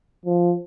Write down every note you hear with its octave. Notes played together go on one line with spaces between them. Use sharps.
F3